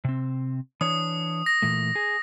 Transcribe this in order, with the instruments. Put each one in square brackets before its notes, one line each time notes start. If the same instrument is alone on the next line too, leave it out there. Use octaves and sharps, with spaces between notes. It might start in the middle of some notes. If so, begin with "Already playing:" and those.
[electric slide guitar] C3 C4
[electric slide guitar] E3 D4 C#5 [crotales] D#6
[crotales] A#6
[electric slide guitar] A#2 E3 A3
G#4